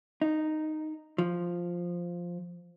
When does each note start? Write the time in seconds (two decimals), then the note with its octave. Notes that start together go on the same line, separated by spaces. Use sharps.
0.22 D#4
1.18 F3